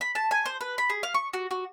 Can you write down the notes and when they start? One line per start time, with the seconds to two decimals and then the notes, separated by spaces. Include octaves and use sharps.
0.01 B5
0.15 A5
0.31 G#5
0.46 C5
0.61 B4
0.78 B5
0.90 G#4
1.03 F5
1.14 C#6
1.33 F#4
1.51 F#4